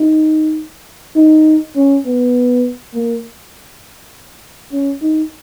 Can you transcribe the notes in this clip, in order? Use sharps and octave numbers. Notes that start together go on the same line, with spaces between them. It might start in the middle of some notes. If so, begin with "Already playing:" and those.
Already playing: D#4
D#4
C#4
B3
A#3
C#4
D#4